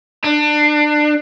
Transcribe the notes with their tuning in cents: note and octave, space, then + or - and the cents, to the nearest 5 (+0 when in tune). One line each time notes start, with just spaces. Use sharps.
D4 +25